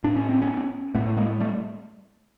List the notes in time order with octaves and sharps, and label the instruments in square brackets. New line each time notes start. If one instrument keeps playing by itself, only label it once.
[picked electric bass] A2 D4
C#4
C4
B3 C#4
A2 A3 B3
G#3 A#3
G3 A3